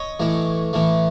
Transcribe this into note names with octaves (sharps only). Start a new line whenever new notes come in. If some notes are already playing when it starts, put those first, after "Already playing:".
Already playing: C#5 D#5
A2 E3 A3
A2 E3 A3